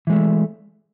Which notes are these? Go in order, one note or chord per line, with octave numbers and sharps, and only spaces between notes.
E3 G#3 A3